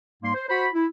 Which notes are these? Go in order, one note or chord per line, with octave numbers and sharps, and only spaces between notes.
G#2 G3 A#3 C6
C5
F#4 C5 B5
E4